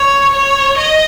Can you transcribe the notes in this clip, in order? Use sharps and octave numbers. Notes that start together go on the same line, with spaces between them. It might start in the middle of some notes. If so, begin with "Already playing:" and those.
Already playing: C#5
C#5
D#5